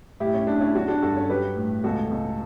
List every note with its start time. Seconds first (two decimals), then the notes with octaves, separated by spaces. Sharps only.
0.20 A2 E4 G4
0.34 C#4
0.47 A2 D4
0.61 C#4 E4
0.75 F#3 D4 F#4
0.88 D4 F#4
1.02 G2 F#4 A4
1.16 C#4
1.29 F#3 G4 B4
1.56 A2
1.84 C#2 F#4 A4
2.11 C#2